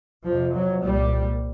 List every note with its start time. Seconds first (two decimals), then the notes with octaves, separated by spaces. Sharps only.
0.24 F2 C3 F3
0.54 F#3
0.82 C2 A#2 G3